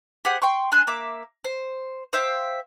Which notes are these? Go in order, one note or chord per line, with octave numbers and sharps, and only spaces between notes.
G4 G#4 C5 F#5
G5 C6 C#6
D4 G#5 C6 F#6
A#3 E5 D6
C5
C5 E5 F5 G5